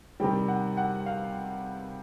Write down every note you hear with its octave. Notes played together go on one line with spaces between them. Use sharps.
C3 D#3 G3 G5
F#5
F#5
F5